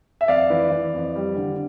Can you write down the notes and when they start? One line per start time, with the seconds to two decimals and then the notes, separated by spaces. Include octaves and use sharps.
0.21 E5
0.28 F2 D5 F5
0.50 E3
0.72 E3
0.94 F2
1.16 G3
1.37 D3